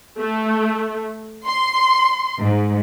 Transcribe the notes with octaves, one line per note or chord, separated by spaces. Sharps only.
A3
C6
G#2